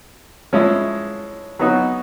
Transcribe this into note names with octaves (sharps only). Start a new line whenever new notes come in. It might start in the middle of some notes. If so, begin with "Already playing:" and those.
F3 G#3 C#4 E4
F#3 B3 D#4 F#4